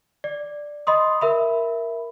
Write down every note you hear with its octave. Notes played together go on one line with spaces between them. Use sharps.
D5
D#5 B5 C6 D#6
A#4 E5 B5